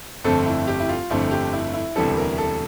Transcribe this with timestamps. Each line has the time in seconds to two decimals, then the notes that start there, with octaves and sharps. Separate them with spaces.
0.24 G1 F2 D3 A3 C4 A4
0.46 E4
0.67 G4
0.80 E4
0.89 F4
1.10 G1 F2 D3 A3 C4 E4
1.31 G4
1.53 E4
1.74 E4
1.96 E1 D2 C3 E3 G3 A4
2.17 A#4
2.38 A4